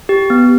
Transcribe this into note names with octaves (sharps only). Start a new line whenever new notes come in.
G4
B3